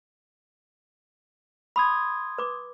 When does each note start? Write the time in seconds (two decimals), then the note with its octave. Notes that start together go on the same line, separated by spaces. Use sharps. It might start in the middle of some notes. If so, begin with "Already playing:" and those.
1.76 B5 C6 D#6 G#6
2.38 B4 D6